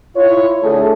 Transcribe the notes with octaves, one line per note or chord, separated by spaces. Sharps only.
E4 F4 C#5
D3 A3 G#4 A4